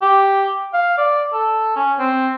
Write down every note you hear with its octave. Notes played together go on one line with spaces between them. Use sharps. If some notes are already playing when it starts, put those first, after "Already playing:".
G4
F5
D5
A4
C#4
C4